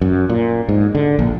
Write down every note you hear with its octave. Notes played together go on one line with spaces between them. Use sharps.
F#2
A#2
G#2
D3
A#1